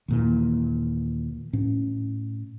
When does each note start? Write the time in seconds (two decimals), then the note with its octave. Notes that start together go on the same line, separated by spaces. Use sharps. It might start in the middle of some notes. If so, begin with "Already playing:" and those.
0.08 D#2 A#2 E3
1.53 A2 C#4